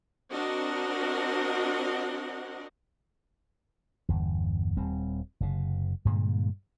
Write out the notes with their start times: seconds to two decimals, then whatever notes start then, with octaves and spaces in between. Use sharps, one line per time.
0.31 C4 D4 F#4 A#4 D#5 F#5
4.09 G1 E2
4.77 D#1 G3 C4
5.40 F#1 C3
6.05 G2 A#2 D3 G#3